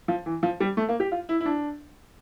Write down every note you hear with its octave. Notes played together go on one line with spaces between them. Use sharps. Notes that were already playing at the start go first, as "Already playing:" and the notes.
F3
E3
F3
G3
A3
A#3
G4
F4
E4
E4
D4